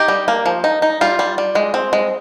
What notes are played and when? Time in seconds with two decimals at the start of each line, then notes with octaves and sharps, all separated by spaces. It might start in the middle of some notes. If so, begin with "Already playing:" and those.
Already playing: D#4 G4
0.08 G3
0.28 A#3
0.46 F3
0.64 D#4
0.82 D#4
1.01 G3 F4
1.19 G3
1.38 G3
1.55 G#3
1.74 C4
1.93 G#3